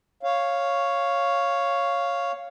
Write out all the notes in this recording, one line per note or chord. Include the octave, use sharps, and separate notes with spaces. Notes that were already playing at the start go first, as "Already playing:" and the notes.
C#5 F5